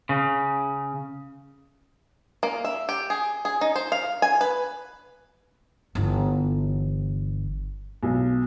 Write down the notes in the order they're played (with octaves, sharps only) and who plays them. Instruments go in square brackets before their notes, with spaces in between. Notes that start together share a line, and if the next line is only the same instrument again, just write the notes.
[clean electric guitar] C#3
[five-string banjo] A#3
E5
G4
G#4
G#4
D#4
C5
F5
G#5
B4
[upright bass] G1 E3
[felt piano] B1